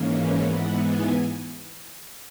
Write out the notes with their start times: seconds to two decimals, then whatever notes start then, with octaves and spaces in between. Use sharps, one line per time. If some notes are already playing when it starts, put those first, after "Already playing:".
Already playing: G#2 E3 A#3 C#4
0.41 G#2 E3 B3 F#5
0.77 G#5